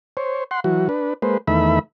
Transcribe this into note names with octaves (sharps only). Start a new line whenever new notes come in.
C5 C#5
F#5 C6
E3 F#3 F#4
D4 B4
G#3 A#3 B4 C5
E2 D#3 A3 E5 B5